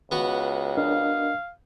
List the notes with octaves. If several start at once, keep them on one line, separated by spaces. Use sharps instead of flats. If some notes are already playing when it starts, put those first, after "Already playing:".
C#2 B3 F#4
D4 A#4 D#5 F5